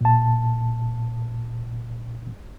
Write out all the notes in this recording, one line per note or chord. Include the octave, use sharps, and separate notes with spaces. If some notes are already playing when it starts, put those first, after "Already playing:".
A#2 A5